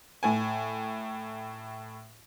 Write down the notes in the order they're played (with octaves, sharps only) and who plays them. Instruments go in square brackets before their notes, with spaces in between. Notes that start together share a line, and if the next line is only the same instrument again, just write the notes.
[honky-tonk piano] A2 G#5